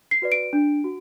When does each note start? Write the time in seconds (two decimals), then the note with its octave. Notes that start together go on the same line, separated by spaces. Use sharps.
0.11 C7
0.22 F#4 B4 D5
0.32 D7
0.53 D4
0.84 F#4